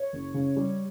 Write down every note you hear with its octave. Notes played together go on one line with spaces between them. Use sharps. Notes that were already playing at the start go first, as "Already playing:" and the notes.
Already playing: C#5
F#1
C#3
G3